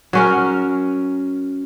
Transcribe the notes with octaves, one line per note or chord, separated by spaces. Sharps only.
F#3 C#4 A#4